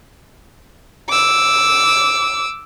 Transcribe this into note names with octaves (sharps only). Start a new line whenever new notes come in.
D6 E6